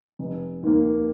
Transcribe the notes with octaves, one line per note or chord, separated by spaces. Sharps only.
F1
D#2 D#3 A#3